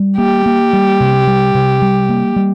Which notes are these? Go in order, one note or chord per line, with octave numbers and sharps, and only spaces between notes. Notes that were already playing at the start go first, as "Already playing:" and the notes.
Already playing: G3
A#3 G4
A#3
G3
C3
G3
C3
G3
A#3
G3